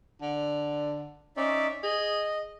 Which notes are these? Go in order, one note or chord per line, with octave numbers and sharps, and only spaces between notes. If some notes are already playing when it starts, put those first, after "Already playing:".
D3
C#4 D#4 D5 E5
G#4 D#5